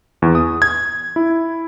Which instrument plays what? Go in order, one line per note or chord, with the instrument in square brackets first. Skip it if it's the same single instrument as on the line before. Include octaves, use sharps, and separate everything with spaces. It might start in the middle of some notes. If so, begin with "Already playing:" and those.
[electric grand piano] E2
D#6
G#6
E4